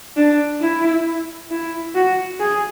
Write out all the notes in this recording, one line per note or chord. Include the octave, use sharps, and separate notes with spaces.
D4
E4
E4
F#4
G#4